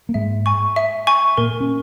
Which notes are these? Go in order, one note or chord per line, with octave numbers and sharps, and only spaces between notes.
A#3
G#2 G#3 E5
G#5 C#6
E5
G#5 C#6
A#2 A#3 A#4
C#4